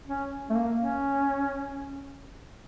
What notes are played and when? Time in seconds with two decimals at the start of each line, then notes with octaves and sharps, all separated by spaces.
0.07 C#4
0.50 A3
0.55 A#3
0.78 C#4